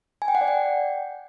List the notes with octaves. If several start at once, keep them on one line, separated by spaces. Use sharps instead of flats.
G#5
G5
F#5
D5
G5